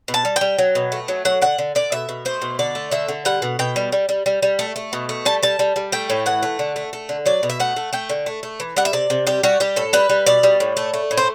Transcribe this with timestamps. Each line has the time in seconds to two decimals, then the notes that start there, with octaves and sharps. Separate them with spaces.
0.08 B2
0.14 A5
0.25 G3
0.36 G5
0.41 G3
0.59 F#3
0.75 B2
0.92 A3
1.08 F#3
1.25 F#3 F#5
1.42 D3 F#5
1.58 D3
1.75 D3 D5
1.92 B2 E5
2.09 B2
2.25 A3 C5
2.42 B2
2.59 D3 D5
2.75 A3
2.91 D3 E5
3.08 D3
3.25 G3 F#5
3.42 B2
3.59 B2 G5
3.76 G3
3.92 G3
4.09 G3
4.26 G3
4.42 G3
4.59 A3
4.76 A3
4.93 B2
5.09 A3
5.25 G3 A5
5.43 G3 A5
5.59 G3
5.76 G3
5.92 A3 G5
6.10 A2
6.26 E3 F#5
6.43 A3
6.59 D3
6.76 A3
6.93 A3
7.09 D3
7.26 F#3 D5
7.43 B2
7.50 E5
7.60 A3 F#5
7.76 A3
7.93 A3 G5
8.09 D3
8.26 A3
8.43 A3
8.60 E3
8.77 G3 F#5
8.85 E5
8.93 C3 D5
9.10 C3
9.27 G3 G4
9.43 G3 F#4
9.60 G3 G4
9.76 A2 A4
9.93 G3 B4
10.10 G3
10.26 B2 D5
10.43 G3
10.60 A2
10.77 A3
10.94 A3
11.11 A2
11.17 C5